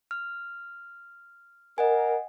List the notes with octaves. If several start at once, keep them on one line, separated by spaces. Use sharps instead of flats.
F6
A#4 D#5 F#5 G#5